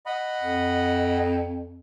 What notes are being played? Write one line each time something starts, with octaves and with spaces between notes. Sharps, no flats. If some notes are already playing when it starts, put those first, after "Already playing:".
D#5 F#5 B5
F2